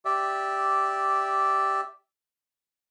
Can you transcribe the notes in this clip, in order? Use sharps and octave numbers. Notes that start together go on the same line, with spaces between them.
G4 D5 E5